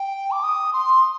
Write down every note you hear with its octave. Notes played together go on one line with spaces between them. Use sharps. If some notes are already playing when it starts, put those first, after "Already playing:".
Already playing: G5
D6
D#6
C6